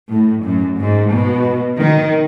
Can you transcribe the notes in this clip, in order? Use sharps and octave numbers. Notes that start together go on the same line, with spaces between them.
A2
F#2
G#2
B2
D#3